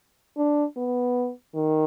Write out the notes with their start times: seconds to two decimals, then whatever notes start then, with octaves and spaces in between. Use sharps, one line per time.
0.37 D4
0.76 B3
1.55 D#3